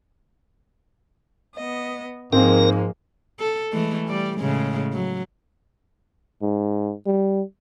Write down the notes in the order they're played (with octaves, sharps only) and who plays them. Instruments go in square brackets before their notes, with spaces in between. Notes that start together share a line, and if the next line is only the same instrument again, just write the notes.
[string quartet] B3 D#5
[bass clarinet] G#2 [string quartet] F3 G#3 A#3 [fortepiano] C4 [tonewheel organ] A#4
[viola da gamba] A4
E3 G#3 A3
G3 D5
A2 C#3 G#3
F#3
[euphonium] G#2
G3